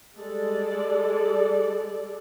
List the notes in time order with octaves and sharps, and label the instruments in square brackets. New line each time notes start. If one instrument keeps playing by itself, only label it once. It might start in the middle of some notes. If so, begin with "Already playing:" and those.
[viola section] G3 G#3 A4 D5